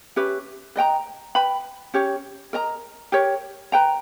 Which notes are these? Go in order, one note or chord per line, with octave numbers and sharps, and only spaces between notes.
C#4 G4 B4 E5
B4 D#5 G5 A#5
B4 G5 B5
C#4 G4 C#5
A#4 D#5 A#5
G4 A#4 C#5
B4 G5 A#5